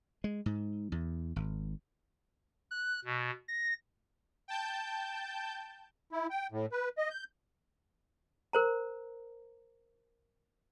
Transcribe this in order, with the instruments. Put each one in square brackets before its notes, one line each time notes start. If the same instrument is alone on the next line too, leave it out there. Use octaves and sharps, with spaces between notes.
[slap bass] G#3
G#2
E2
G#1
[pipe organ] F#6
B2
A#6
[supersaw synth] G5 A5 G6
[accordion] E4
G5
A2
B4
D#5
G6
[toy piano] A#4 C5 A#5